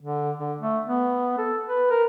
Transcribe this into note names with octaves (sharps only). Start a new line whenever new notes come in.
D3
D3
A3
B3
A4
B4
A#4